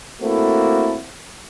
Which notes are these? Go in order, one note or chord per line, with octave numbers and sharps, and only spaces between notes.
A3 A#3 C4 E4 F#4 A4